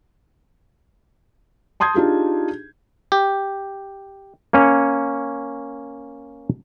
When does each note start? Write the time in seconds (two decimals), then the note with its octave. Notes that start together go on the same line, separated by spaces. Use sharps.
1.80 A5 C6 D#6 G6 G#6
1.94 D4 D#4 F4 G4 G#4
3.12 G4
4.53 A#3 C#4 C#5